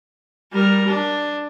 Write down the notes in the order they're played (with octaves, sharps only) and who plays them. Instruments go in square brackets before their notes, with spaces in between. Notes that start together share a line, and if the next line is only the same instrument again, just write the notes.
[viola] G3 A#4
D4